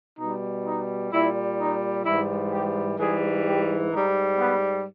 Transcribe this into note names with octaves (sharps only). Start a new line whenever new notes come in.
B2 G3 D#4
D#4
A#2 G3 E4
D#4
G#2 E3 G3 E4
G4
G#2 E3 G3 G#4
G4
G#2 G3 D#4
B3